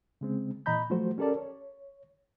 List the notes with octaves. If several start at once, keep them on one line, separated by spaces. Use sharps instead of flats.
C#3 G#3 C4
A#2 E3 D#5 A#5 B5 G6
F3 F#3 A3 F#4 C5
C#4 G4 A4 A#4 D5 A5
C#5